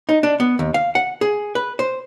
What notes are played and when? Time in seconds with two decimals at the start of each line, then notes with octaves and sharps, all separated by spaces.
0.09 D#4
0.23 D4
0.40 B3
0.59 D#2
0.74 F5
0.95 F#5
1.21 G#4
1.55 B4
1.79 C5